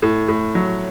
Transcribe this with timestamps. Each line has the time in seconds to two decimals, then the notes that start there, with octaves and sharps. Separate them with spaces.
0.02 A2
0.28 A2
0.55 F#3